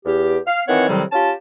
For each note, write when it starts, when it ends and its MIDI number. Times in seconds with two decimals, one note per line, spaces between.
0.06 0.38 40
0.06 0.38 67
0.47 0.61 77
0.68 0.86 51
0.68 0.86 52
0.68 0.86 60
0.68 0.86 73
0.68 0.86 78
0.88 1.03 45
0.88 1.03 48
0.88 1.03 51
0.88 1.03 54
0.88 1.03 55
1.12 1.31 61
1.12 1.31 65
1.12 1.31 67
1.12 1.31 81